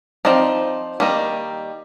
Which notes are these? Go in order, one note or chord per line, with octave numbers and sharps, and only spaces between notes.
F3 C4 D#4 D5
D#3 G3 A#3 D#4